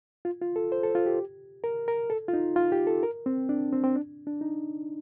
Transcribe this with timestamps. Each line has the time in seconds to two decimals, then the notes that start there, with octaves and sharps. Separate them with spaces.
0.25 F4
0.41 F4
0.56 A4
0.72 C5
0.83 A4
0.95 F4
1.06 G4
1.64 A#4
1.88 A#4
2.10 A4
2.28 F4
2.33 D#4
2.56 F4
2.72 G4
2.87 A4
3.03 A#4
3.26 C4
3.49 D4
3.72 C4
3.84 C4
3.95 D4
4.27 D4
4.41 D#4